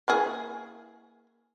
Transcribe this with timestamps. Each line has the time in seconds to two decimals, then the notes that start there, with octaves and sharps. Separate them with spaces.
0.08 A#3 E4 G#4